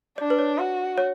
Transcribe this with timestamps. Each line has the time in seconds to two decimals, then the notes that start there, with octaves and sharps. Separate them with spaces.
0.18 D4 D5
0.30 B4
0.39 C#5
0.58 F#4
0.98 C#5